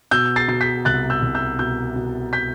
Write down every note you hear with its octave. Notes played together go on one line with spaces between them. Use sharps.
B2 E6 G6
A6 C7
B2 C7
G6 B6
C2 F#6 A6
E6 G6
C2
E6 G6
B2 E6 G6
B2
G6 B6